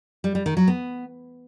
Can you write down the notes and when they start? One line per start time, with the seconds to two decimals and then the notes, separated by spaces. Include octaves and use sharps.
0.24 G3
0.35 G3
0.46 D#3
0.57 F#3
0.68 B3